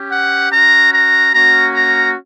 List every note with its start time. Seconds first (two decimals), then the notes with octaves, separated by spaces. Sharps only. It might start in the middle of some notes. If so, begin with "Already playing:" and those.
Already playing: C#4 G4
0.10 F#5
0.50 C#4 F#4 A#5
0.92 A#5
1.33 A#3 C#4 F#4 A#5
1.73 A#5